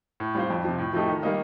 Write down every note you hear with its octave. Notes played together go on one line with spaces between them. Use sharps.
A2
G3 C4 F4 C5
F2
C3 F3
A2
F3 A3 D#4 G4
D#3
G3 A#3 D#4